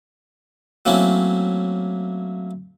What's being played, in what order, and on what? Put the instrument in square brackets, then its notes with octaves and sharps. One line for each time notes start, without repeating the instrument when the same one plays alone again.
[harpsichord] F#3 A3 A#3 C4 C#4 E4